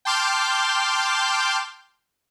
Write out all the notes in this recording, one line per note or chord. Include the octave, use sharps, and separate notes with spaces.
G5 A5 C6 D6 F6 G6